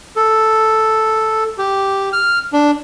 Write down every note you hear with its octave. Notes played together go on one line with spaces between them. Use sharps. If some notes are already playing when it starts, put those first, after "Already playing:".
A4
G4
F6
D4